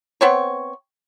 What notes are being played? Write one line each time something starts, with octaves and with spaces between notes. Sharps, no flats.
B3 C4 C#5